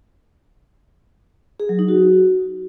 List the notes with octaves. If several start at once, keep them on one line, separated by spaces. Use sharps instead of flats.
G#4
F#3
D#4
F#4